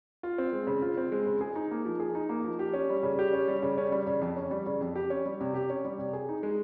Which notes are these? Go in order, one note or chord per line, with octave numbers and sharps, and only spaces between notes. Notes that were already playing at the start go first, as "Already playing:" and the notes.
F4
C4
G#3
C#3
F4
C4
G#3
C#3
G#4
D#4
A#3
F3
G#4
D#4
A#3
F3
G4
C#4
G3
C#3
G4
C#4
G3
C#3
C#4
G3
C#3
F2
C#4
G3
C#3
F2
G4
C#4
G3
C3
G4
C#4
G3
C3
G#4
D#4
G#3